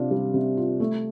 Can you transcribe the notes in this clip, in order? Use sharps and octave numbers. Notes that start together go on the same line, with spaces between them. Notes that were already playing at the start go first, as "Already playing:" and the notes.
Already playing: C3 D4 F4
G3
C3
F4
A3